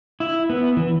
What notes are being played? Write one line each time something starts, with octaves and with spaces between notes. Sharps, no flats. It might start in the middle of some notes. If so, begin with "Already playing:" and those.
E4
B3
E3